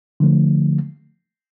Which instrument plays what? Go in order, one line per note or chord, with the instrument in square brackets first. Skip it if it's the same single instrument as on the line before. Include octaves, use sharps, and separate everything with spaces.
[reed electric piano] D3 F3 A3